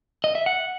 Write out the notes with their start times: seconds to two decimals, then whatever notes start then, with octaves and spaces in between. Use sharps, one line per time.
0.24 D#5
0.35 E5
0.46 F#5